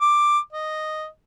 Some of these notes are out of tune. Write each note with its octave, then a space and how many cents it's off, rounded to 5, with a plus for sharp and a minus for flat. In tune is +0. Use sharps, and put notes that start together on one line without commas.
D6 +10
D#5 -5